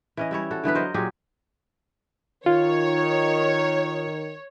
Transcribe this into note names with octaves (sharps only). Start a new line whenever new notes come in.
E3 C#4 D#5
G3 E4 C#5
F#4 A4
D3 E3 B3 B4
F#3 A#4 C5 D#5
A#2 F#3 G4 G#4
D#3 F4 C#5